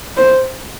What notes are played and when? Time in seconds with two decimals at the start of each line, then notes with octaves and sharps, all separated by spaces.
0.17 C5